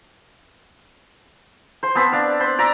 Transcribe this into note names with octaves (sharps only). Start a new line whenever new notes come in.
C5 C6
B3 C4 A5 B5
D4 D5 F5
C5 B5 C6
D5 E5 A#5 D6